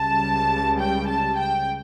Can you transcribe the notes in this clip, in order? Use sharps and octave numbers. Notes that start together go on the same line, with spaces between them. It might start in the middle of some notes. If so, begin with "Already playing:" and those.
Already playing: C#2 C#3 G3 A5
G5
A5
G5